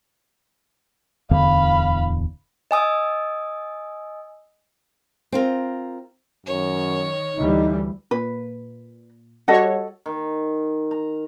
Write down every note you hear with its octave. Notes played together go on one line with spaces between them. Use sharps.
D1 E2 D3 F5 B5
D#5 G#5 D#6 E6
C4 F4 A#4
F#2 D#3 C#5
D2 E3 G3 D#4
A#2 B4
G3 F#4 A4 C#5 D#5 F#5
D#3
A#5